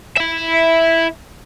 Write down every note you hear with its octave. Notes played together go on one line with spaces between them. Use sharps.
E4 E5